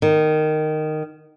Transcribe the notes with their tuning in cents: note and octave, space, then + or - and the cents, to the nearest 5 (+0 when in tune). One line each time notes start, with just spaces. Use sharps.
D#3 -10